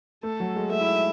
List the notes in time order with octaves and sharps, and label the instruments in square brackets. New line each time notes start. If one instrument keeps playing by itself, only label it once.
[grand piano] A3 [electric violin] A4
[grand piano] F#3
G#3
[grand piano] A3 [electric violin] E5
[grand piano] E4
D#4